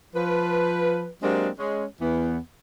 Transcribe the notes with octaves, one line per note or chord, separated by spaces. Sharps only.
F3 B4
F#3 G#3 A#3 C4 D4 G4
G#3 C#4
E2 E3 B3